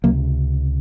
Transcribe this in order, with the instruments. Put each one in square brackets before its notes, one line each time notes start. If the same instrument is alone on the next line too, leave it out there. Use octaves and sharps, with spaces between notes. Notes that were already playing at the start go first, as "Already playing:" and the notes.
[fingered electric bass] C#2 C3 F#3 A#3